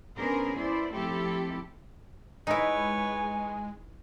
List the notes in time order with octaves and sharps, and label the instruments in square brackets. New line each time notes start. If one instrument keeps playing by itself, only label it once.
[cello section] B3 C#4 D4 G#4 A#4 C5
B3 E4 C5 D5
F3 A3 C4 E4 G4 A4
[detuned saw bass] G#3 [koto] D#4 E4 [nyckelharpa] B4 C#5 [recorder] G#5